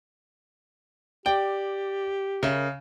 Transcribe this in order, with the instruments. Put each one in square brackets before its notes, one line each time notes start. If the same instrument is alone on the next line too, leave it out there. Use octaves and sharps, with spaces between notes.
[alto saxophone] G4 [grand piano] D5 [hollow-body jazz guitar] G5
[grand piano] C#3 [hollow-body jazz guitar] A#4 E5